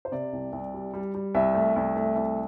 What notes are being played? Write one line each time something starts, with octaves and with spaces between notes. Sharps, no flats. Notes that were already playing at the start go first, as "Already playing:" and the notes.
C5
C3 D5
C2
C2
G3
G3
G3
C2 E5
A3
C2
A3
C2